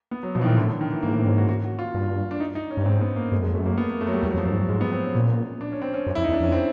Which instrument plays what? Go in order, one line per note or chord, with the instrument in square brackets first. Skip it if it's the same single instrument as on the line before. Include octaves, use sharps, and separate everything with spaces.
[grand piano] B3
F#3
[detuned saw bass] B2 [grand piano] F3
[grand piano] E3
[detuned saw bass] A#2 [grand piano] D#3
[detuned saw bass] A2 [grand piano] D3
[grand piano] D3
D#3
E3
[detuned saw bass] G#2 [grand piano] A#3
[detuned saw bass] A2 [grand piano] C4
[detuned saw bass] G#2 [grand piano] C#4
[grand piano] F#4
F#4
F#4
F4
[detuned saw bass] G2
[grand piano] D4
D#4
D#4
C#4
[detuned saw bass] G2
[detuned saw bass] G#2 [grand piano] C4
[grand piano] B3
A#3
[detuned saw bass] G2 [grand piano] A3
[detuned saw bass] F#2
[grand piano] G#3
[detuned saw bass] F2
[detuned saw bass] F#2 [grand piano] A3
[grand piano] A#3
B3
A#3
A3
F#3
G3
[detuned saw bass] E2 [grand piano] G3
[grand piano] F#3
[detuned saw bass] F2
[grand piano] F3
[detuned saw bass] F#2 [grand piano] F#3
[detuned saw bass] G#2
G2
[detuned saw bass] G#2 [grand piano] G#3
[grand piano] B3
C4
C#4
[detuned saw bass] A#2
[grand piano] D4
C#4
C4
C#4
[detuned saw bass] F#2
[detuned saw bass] F2 [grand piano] E4
[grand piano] D#4
[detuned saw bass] E2
[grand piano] D4
[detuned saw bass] F2 [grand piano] C#4
[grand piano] C4